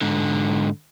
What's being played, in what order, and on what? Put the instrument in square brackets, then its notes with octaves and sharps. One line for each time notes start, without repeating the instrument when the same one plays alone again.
[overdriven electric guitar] G#2 D3